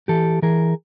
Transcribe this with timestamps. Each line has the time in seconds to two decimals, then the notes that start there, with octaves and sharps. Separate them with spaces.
0.08 E3 G4 A4
0.42 E3 G#4 A#4